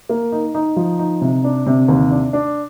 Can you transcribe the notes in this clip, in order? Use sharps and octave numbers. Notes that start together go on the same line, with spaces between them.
A#3
D#4
D#4
F3
D#4
C3
D4
C3
D#2
D4
D4